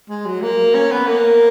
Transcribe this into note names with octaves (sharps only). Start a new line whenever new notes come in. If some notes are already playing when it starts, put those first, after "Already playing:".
G#3
F#3
A#3
C#4
B3
A#3